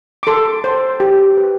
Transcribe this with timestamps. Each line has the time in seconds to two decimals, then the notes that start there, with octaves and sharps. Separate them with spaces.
0.23 D6
0.27 A4 C6
0.64 C5
1.00 G4
1.37 B4